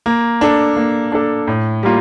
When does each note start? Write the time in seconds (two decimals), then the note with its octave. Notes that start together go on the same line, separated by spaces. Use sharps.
0.06 A#3
0.41 D4 A4
0.76 A#3
1.12 D4 A4
1.47 A2
1.83 G3 A#3 F4